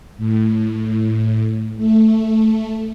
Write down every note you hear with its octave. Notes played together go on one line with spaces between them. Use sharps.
A2
A3